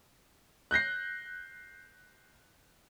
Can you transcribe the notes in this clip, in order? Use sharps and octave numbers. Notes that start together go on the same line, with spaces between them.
F#6 G6 A#6 C7